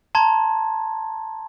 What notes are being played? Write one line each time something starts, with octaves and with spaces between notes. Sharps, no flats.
A5 A#5 C6 G#6